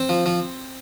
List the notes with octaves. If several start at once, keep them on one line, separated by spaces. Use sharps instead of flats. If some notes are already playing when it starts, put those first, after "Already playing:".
Already playing: C4 C5
F3
F3